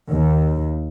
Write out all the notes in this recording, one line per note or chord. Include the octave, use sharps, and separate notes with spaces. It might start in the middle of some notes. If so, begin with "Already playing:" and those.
D#2